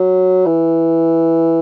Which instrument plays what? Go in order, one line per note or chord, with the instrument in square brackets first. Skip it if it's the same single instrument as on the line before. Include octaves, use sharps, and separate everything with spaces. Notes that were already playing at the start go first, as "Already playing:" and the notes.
Already playing: [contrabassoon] F#3
E3